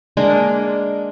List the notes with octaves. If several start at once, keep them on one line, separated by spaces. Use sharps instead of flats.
G#3 A#3 D4 A#4